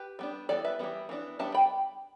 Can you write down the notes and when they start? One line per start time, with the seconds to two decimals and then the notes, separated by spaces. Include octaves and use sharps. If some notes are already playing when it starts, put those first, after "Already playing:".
Already playing: G4 B4
0.19 G3 B3 D4
0.49 E3 G3 B3 A4 D5
0.65 B4 E5
0.79 E3 G3 B3
1.09 E3 B3 D4
1.39 G3 B3 D4 E5 A5
1.54 G5 B5